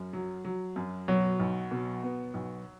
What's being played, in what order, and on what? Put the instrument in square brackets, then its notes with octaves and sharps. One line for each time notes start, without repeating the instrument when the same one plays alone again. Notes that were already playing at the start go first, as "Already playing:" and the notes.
Already playing: [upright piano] F#2
F#3
F#3
F#2
[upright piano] B2 [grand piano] F#3
[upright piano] B1
B2
B3
B1